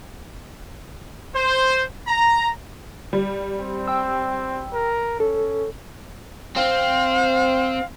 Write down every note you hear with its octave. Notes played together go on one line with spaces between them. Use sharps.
C5
A#5
G3
C4
G5 E6
A#4
C#4 A4
C4 F5